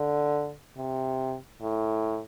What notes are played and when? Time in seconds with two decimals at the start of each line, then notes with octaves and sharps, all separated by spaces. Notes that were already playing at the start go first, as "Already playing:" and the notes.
Already playing: D3
0.77 C3
1.61 A2